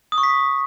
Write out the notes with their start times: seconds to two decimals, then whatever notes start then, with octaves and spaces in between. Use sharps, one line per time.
0.12 D#6
0.18 C#6
0.23 B6